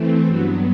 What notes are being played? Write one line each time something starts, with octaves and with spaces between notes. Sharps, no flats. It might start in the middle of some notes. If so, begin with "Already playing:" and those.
Already playing: E3 A3 C4
G2 F#3 B3